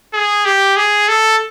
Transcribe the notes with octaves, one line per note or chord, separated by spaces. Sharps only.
G#4
G4
G#4
A4